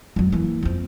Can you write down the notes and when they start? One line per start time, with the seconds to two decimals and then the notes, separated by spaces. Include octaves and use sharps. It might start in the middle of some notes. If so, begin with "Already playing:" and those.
0.16 F2 F#3
0.32 E3 A#3
0.63 F2 C4